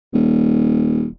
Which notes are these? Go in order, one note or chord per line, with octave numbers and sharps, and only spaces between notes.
D#1